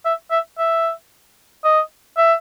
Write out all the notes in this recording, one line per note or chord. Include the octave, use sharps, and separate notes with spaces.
E5
E5
E5
D#5
E5